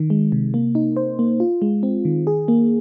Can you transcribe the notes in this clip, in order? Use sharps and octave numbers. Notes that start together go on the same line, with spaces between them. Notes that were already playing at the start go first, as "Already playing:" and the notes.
Already playing: D#3
G#3
C3
A#3
D#4
C5
A#3
F4
G#3
C4
D#3
G#4
A#3